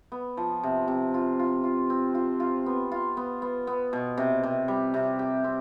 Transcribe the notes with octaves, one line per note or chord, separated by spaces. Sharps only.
B3
F3
C3
C3
F4
F4
F4
C4
F4
F4
B3
F4
B3
B3
B3
B2
C3
C3
G3
C3
G4
C4